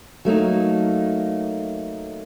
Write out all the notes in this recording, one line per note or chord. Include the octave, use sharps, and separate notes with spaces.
F#3 A3 A#3 D#4